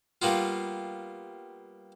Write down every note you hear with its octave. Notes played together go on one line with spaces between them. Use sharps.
G3 A#3 B3 F4